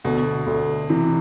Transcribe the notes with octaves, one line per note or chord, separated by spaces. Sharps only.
D2 B2
D2
C3 E3